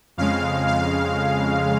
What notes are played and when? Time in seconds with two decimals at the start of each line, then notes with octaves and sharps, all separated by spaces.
0.17 F2 C#3 G#3 F5
0.68 F5